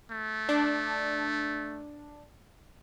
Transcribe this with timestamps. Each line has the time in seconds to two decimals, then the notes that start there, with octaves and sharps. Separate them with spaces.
0.11 A3
0.49 D4